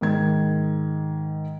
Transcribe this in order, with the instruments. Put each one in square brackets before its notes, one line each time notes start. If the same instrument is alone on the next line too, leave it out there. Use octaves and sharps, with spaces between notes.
[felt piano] G#2 D#3 G#6